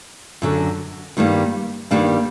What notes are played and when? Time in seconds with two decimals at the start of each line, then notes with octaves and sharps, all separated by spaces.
0.42 F#2 D3 F#3
1.17 G2 D#3 G3 A#3
1.91 G2 D#3 G3 A#3 D4